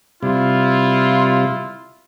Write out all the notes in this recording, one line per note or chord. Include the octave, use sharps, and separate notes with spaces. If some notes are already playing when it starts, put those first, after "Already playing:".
C3 G3 E4 F4